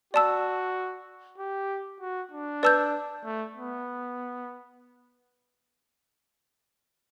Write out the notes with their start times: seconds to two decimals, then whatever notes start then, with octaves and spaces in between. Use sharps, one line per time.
0.14 F#4 D5 A5 E6
1.38 G4
2.00 F#4
2.32 D4
2.63 B4 D5 A5 E6 G6
3.25 A3
3.56 B3